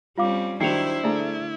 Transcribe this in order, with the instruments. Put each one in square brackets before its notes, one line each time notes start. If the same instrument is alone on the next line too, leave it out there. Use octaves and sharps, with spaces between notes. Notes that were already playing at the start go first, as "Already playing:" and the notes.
[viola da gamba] G3 C4 C#4 [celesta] F4 F5 D6
[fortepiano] D#3 F#3 [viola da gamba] D4 C5 [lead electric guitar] E4 [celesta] C7 C#7 F7
[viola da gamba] D3 A3 [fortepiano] D4 G#4 A#5